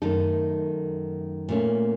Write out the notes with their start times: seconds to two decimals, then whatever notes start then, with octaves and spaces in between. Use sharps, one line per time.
0.02 F#2 D#3 A3 D#4 A4
1.49 A#2 A3 C#4